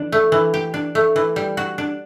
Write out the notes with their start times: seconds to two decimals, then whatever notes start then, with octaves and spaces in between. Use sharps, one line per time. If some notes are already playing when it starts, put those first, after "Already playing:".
Already playing: E3 D4
0.12 A3
0.32 E3
0.54 G4
0.74 D4
0.95 A3
1.16 E3
1.36 G3
1.57 F#4
1.78 D4